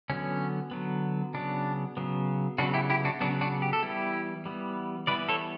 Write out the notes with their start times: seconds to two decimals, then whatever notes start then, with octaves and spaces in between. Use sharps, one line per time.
0.09 D3 F#3 B3 C#4
0.71 D3 F#3 B3
1.34 C#3 F#3 B3 D4
1.97 C#3 F#3 B3
2.58 C#3 F#3 B3 D4 F#4
2.74 E4 G4
2.90 E4 G4
3.05 D4 F#4
3.21 C#3 F#3 B3 D4 F#4
3.41 D4 F#4
3.62 G4
3.73 A4
3.83 E3 G3 B3 E4 G4
4.46 E3 G3 B3
5.07 E3 G3 B3 B4 D5
5.29 A4 C#5